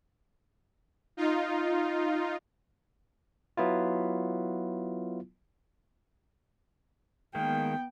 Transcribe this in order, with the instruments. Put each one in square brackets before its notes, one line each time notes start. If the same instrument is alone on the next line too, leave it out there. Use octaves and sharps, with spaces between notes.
[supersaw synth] D#4 F4
[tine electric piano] F#3 B3 E4 F4
[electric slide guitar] D#3 G#3 A#3 [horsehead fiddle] B3 G5